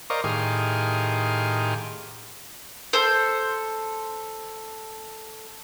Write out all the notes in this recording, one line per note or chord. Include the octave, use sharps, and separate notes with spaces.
A#4 C5 D5 D#5 F5 C#6
A2 D#3 G4 G#4 F5 C6
A4 C5